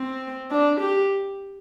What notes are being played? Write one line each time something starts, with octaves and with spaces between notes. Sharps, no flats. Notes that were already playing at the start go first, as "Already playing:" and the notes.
Already playing: C4
D4
G4